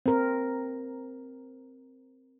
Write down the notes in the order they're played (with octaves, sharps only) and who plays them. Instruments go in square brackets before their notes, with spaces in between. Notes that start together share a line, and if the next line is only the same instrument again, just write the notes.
[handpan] C4 A#4